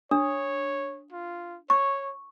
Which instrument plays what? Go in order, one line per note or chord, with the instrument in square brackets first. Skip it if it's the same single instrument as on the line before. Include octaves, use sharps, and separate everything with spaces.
[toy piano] D4 [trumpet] C#5 [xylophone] D#6
[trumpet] F4
[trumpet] C#5 [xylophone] C#6